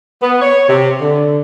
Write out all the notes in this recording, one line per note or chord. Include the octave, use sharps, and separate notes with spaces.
B3
C#5
C3
D3